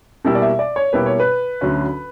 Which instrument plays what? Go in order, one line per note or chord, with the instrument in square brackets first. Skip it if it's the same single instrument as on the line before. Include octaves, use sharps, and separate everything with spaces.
[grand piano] B2 G3 A#3 E4 G4
[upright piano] D5
E5
D5
C#5
[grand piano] B2 G3 A#3 E4 G4 [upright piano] B4
[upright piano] C#5
B4
[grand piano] D2 D3 F#3 C#4